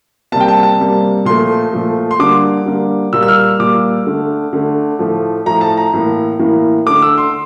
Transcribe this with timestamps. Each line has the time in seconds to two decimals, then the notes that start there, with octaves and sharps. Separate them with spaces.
0.32 C3 G3 A#3 A5
0.40 G5
0.48 A5
0.63 A5
0.80 C3 G3 A#3
1.25 A#2 F3 A3 C6
1.72 A#2 F3 A3
2.11 C6
2.19 D3 G3 A#3 D6
2.66 D3 G3 A#3
3.13 A#2 G3 A#3 E6
3.23 E6
3.28 F6
3.59 A#2 G3 A#3 D6
4.07 D3 A3
4.53 D3 A3
4.99 A2 F3 A3
5.46 A2 F3 A3 A#5
5.61 A5
5.78 A#5
5.93 A2 E3 A#3
6.39 A2 E3 A#3
6.86 D3 A3 D6
7.02 E6
7.18 C6